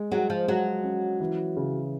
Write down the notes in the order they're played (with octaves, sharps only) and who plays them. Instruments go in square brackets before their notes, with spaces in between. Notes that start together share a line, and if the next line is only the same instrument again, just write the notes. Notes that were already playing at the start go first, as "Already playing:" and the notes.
Already playing: [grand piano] G#3
[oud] F#3 [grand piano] G#3
[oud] F3
[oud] F#3 [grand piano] G#3
[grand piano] C#4
E3
C#3